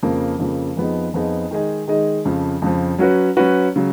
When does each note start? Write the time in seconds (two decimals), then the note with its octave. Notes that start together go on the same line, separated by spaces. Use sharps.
0.03 F2 C#3 F3 A#3
0.39 F2 C#3 F3 A#3
0.77 F2 F3 B3 D#4 G#4
1.14 F2 F3 B3 D#4 G#4
1.51 D#3 G#3 D#4 G#4 D#5
1.88 D#3 G#3 D#4 G#4 D#5
2.25 F2 C#3 F3
2.62 F2 C#3 F3
2.99 F#3 C#4 F#4 B4
3.37 F#3 C#4 F#4 B4
3.76 C#3 F#3